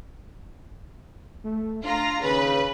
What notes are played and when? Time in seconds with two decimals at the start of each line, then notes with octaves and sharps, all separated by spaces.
1.45 A3
1.84 D4 F4 A#5
2.22 D#2 C#3 B4